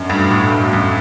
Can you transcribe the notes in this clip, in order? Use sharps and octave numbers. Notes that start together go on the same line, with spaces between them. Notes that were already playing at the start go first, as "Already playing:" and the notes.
Already playing: F#2 B2 A3 D4 F#4
G2
A2
G2
F#2